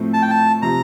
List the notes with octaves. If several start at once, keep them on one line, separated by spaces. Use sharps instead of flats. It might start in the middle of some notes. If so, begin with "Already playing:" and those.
Already playing: A2 F3 A3 C4 E4
A5
G5
A5
C3 F3 A#5